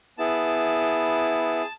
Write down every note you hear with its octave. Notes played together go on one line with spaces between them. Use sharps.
B3 E4 G#4 A5